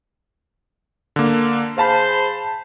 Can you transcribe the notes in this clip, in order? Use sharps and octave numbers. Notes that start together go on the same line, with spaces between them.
D3 A#3
G#4 C5 F5 A5 B5